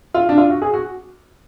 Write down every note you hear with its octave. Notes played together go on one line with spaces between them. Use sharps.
F4
D4
F4
F#4
G#4
F#4